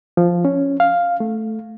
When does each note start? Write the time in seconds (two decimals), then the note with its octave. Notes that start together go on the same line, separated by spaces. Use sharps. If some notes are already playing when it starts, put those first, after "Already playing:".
0.17 F3
0.45 C#4
0.80 F5
1.20 A3